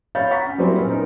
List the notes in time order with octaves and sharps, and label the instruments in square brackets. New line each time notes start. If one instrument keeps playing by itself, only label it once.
[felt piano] C#5 F5 B5 G6 A6
F#5 A#5 C#6 A6 B6
C#4
F#3 G3 A#3 C4 E4
A#2 B3 C#4
D#4 A#4